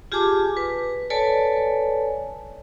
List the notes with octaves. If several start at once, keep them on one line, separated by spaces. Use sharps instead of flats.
F4 G4 G#4 G#5 A5 D6
B4
A4 B4 C#5 D5 G#5 A5